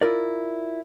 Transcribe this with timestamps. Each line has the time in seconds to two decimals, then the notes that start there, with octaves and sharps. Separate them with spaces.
0.01 E4 F4 A#4 D5